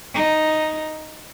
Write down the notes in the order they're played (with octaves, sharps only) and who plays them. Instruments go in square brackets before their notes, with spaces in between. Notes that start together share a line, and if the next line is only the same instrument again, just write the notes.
[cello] D#4